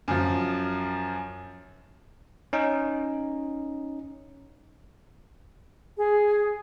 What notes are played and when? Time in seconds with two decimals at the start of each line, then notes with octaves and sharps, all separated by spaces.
0.08 F#2 F3
2.53 C#4 D#4
5.97 G#4